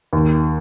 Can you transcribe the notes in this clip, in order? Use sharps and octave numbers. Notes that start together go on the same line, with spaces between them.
D#2